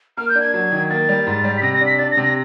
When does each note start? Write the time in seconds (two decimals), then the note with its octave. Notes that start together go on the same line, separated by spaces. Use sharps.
0.17 A#3 F6
0.29 G6
0.35 D4
0.41 G#6
0.54 F#3
0.72 D#3
0.90 A#3 A6
1.08 G3
1.26 G#2
1.44 G3
1.57 B6
1.62 C3 A#6
1.74 A#6
1.81 D4
1.86 B6
1.99 D4 A6
2.11 A#6
2.17 C3
2.23 A#6